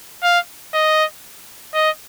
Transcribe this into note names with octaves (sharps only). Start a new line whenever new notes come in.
F5
D#5
D#5